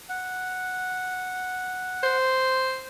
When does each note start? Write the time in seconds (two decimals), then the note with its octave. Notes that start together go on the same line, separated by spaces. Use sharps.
0.09 F#5
2.03 C5